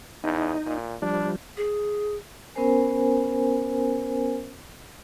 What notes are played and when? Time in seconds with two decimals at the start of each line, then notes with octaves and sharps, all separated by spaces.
0.24 E2 D#4
0.66 A#2
1.02 F3 G3 D4
1.57 G#4
2.55 B3 C#4 A#4 C5 G#5